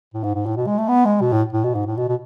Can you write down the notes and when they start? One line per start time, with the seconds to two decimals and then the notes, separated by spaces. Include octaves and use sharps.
0.14 A2
0.23 G#2
0.35 G#2
0.46 A2
0.56 B2
0.67 G#3
0.78 A3
0.88 B3
1.05 G#3
1.21 B2
1.32 A2
1.53 A2
1.64 B2
1.75 G#2
1.87 A2
1.97 B2
2.08 B2